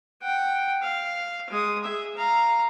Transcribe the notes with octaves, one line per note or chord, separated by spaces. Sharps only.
F#5 G5
F5
G#3 D#6
G#4 E5
F5 A#5